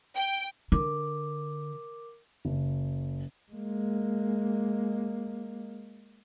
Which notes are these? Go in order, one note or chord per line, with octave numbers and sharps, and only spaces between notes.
G5
D3 A#4 D6
F#1
G#3 A#3